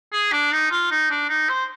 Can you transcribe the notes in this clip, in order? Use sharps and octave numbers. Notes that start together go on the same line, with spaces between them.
G#4
D4
D#4
F4
D#4
D4
D#4
C5